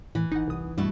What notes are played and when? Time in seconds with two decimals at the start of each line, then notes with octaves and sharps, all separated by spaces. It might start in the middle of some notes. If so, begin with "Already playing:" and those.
0.15 A2 E3
0.32 G#1 D#4 F#5
0.47 F1 C2 D#6
0.78 G2 B2 G3 A3 E4